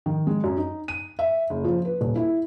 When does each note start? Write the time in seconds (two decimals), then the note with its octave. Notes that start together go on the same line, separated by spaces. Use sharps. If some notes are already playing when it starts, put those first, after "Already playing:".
0.06 D#3
0.27 G#3
0.44 F#2
0.57 D#4
0.88 D#7
1.19 E5
1.50 F#1
1.64 F3
1.85 B4
2.01 D#1
2.15 E4